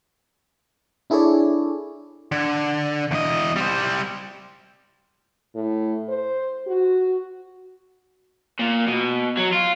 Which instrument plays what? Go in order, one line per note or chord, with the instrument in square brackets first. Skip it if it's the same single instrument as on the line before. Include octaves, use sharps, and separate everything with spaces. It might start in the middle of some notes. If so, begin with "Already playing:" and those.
[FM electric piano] D4 E4 G#4 A4 C#5 D5
[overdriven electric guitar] D3
E2 D#5
G3 C5
[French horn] A2
C5
F#4
[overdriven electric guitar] A#2
B2
F#3
F4